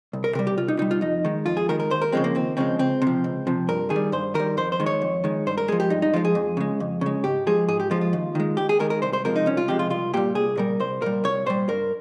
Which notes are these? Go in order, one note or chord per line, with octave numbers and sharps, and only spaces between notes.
C2
A#4
C3 G3 A#4
G4
C2 F4
D#4
C3 G3 D#4
F4
F2 D#4
D#3 G#3
F2 F4
G#4
D#3 G#3 A#4
A#4
D#2 C5
A#4
C#3 F3 G#3 C4
A#3
D#2 C4
C#3 F3 G#3 C4
C#2 C4
C3
F3
C#2
C3 F3
G2 A#4
D#3 G#4
G3
G2 C5
D#3 G3 A#4
F2 C5
C5
D#3 G#3
C#5
F2
D#3 G#3
G2 C5
A#4
F3 G#3 G#4
G4
G2 D#4
D#4
F3 G#3 F4
G#4
F2
C#3 G#3
F2
C#3 G#3
G#2 G4
F3 G#3 G#4
G#2 G#4
G4
F3 G#3 F4
F4
D#2
D#3 G#3
D#2 G4
G#4
D#3 G#3 A#4
A#4
C2 C5
C5
C3 F3 G#3 A#4
D#4
C2 C#4
F4
C3 F3 G#3 G4
F4
C2 F4
A#2 G3 G4
C2 G#4
A#2 G3 A#4
C2 C5
A#2 G3 A#4
C2 C#5
A#2 G3 C5
G2 A#4